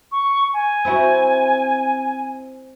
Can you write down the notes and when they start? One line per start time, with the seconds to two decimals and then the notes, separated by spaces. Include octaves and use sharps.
0.12 C#6
0.54 G#5
0.85 C4 E4 F#4